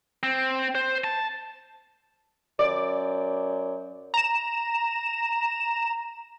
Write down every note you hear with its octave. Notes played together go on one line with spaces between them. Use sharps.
C4
C5
A5
F#2 D5
A#5 E7